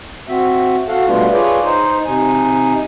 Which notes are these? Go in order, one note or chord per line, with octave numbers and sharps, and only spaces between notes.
C4 F#4 E5
F#4 A4 F5 F#5
B2 G3 A3 B3 D4 F4
F4 G#4 B4 C#5 D5
D#4 C5
C3 D#4 G#5